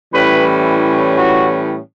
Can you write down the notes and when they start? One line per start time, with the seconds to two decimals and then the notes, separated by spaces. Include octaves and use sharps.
0.14 A2 E3 G3 C#4 B4
1.16 F#4